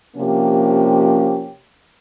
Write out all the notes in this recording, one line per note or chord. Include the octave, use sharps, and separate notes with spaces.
C3 F3 A#3 C#4 G4